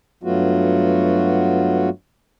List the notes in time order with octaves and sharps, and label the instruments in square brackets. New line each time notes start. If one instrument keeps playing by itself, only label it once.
[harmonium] G2 F#3 A3 B3 F4 F#4